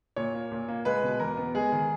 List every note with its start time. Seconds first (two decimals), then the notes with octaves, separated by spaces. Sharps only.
0.16 A#2 C#5
0.34 A#3
0.52 A#2
0.68 A#3
0.85 G#3 B4
1.03 B2
1.20 E2 A#4
1.37 B3
1.55 G#3 G#4
1.72 D#3